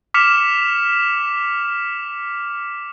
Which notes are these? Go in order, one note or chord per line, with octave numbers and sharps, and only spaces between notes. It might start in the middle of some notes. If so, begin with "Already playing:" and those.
D6 F6 B6 C#7 E7 F7